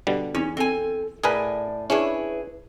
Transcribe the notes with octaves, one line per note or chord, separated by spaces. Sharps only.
B2 D3 G3
E2 C#4 D#4
C4 A4 G#5
A2 G#4 A#4 B4 D5 G#5
C#4 D4 E4 G#4 B4 C#5